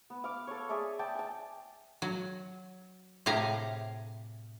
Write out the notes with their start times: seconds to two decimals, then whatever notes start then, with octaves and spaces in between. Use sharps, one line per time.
0.10 B3
0.24 F5 D6
0.47 A4 C#5
0.69 G#4 D5 E5 A5
0.99 D5 G5 A5
1.15 G#5 A5
2.02 F#3
3.26 A2 C3 G4 G#4 F5 A#5